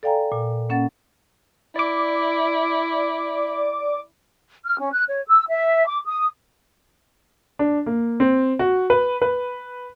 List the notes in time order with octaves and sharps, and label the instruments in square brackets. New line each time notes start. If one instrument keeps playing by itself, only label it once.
[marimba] A4 D5 F5 G5 G#5 A#5
A#2
A#3 C#4 F#5 A6
[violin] E4 [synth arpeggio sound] D5 D6
[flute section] F6
C#4
F#6
C#5
E6
E5
D6
D#6
[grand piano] D4
A#3
C4
F#4
B4
B4